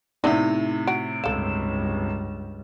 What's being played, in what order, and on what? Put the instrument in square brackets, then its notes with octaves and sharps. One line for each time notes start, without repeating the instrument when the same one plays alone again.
[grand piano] A2 C3 [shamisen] B3 D4 [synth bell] D#4 E5
[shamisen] F#4 [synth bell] D7
[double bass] C#2 G2 [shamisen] A4 F5 [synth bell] E7